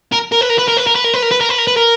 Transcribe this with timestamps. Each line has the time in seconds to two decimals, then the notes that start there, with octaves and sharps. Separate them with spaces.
0.12 A#4
0.32 A#4
0.41 B4
0.50 A#4
0.59 B4
0.68 A#4
0.77 B4
0.87 A#4
0.95 B4
1.04 A#4
1.14 B4
1.22 A#4
1.31 B4
1.41 A#4
1.49 B4
1.58 A#4
1.68 B4
1.77 A#4